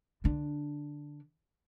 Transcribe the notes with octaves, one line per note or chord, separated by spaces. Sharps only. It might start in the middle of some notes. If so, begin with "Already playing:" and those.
D3 D4